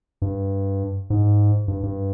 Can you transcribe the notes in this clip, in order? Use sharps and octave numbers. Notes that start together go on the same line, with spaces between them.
G2
G#2
G2
G2